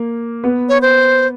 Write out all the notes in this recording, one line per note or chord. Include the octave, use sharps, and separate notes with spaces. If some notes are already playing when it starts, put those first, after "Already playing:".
Already playing: A#3
B3 B4
C#5
C5